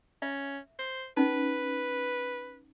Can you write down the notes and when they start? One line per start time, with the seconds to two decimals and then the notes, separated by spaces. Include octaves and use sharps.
0.22 C#4 E5
0.79 C5
1.17 C#4 D#4 B4